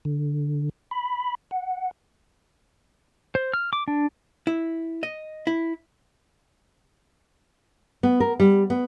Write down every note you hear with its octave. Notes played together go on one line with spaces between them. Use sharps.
D3
B5
F#5
C5
F6
D6
D4
E4
D#5
E4
B3
A#4
G3
B3